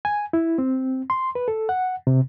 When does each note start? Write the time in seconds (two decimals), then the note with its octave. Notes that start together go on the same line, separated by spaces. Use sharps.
0.05 G#5
0.33 E4
0.58 C4
1.10 C6
1.35 B4
1.48 A4
1.69 F#5
2.07 C3